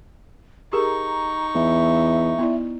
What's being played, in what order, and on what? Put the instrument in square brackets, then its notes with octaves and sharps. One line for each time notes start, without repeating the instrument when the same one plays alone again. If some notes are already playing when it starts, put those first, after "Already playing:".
[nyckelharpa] D#4 C#6 [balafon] G4 G#4 A#4 [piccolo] A#5
[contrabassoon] E2 [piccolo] E5
[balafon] B3 E4 D5